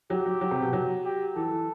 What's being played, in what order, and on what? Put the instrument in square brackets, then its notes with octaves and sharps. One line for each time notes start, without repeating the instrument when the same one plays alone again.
[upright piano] F#3 [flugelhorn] G4
[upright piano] F#3
F#3
C3
B2
F#3
[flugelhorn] G4
[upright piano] E3 [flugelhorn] A4
[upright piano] E3